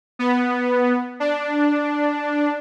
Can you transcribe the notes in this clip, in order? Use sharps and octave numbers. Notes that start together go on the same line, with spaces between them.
B3
D4